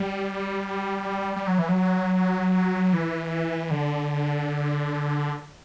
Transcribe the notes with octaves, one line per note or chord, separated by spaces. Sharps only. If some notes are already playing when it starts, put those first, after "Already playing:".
Already playing: G3
G3
F#3
E3
F#3
E3
D3